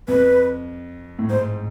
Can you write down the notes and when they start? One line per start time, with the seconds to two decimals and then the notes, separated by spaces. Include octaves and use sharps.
0.08 F2 B4
1.19 A2
1.30 G#2 C5